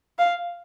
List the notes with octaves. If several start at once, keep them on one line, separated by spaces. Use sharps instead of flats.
F5